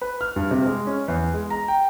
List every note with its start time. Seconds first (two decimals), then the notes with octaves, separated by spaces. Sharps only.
0.01 B4
0.21 F6
0.36 G2
0.51 C3
0.66 G#3
0.87 C#4
1.08 E2
1.34 G#3
1.50 A#5
1.68 G5